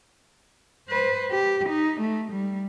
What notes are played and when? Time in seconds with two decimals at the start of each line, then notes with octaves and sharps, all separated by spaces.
0.89 B4 C5
1.31 G4
1.69 D#4
2.01 A3
2.32 G3